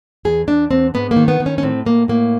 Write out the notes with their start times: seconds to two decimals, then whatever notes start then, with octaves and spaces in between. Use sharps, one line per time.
0.25 E2 G#4
0.47 E2 D4
0.71 E2 C4
0.94 G#2 B3
1.11 A#3
1.16 D#3
1.28 B3
1.40 D#3
1.46 C#4
1.58 C#4
1.63 A2 C4
1.85 A2 A#3
2.08 A2 A#3